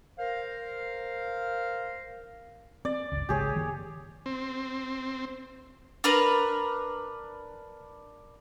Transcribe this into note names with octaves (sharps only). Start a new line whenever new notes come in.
A#4 C5 F5
C4 D5
G1 C#2
G#1 C#3 G#3 G4 G#4 C#5
F#1 D#3 A#3
C4
D4 A#4 B4